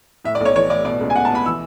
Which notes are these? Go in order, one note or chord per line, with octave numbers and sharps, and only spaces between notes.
A2 E5
D5
B1 C#5
E3 C#5
A2 D5
B2 D5
C#2
G#5
B2 F#5
A5
B2 B5
E3 E6